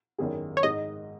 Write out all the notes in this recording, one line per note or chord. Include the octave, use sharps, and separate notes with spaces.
G#1 F#2 D#3 B3 G#4
C#5
G#2 G#3 D#4 D#5